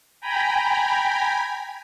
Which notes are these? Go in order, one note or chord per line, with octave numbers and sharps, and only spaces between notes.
G5 G#5 A#5 B5